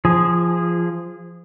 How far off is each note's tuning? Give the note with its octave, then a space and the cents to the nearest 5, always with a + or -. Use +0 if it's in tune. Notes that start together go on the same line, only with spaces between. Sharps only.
F3 -20 G#4 -15